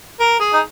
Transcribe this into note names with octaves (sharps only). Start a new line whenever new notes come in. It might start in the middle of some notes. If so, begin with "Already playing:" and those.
A#4
G#4
D#4